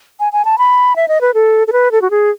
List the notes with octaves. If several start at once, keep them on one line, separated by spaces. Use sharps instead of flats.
G#5
G#5
A5
B5
E5
D#5
B4
A4
A4
B4
A4
F#4
G#4